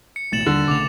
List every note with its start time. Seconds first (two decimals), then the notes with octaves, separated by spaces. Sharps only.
0.16 C#7
0.33 A1 B2 A3 A6 E7 F#7
0.46 D#2 D3 G3
0.68 B1 C#3 A3 D6 F7